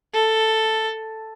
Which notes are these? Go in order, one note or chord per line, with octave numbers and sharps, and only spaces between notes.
A4